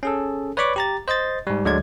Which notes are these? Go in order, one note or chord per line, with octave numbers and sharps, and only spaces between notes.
C#4 G#4 A4
B4 C#5 D5 B5 C#6 D6
G4 A#5 A6
C5 D#5 C6 A6
G#2 G3
D2 D3 F#3 G#3 D5 G#6